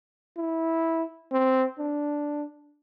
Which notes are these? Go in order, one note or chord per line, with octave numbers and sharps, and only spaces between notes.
E4
C4
D4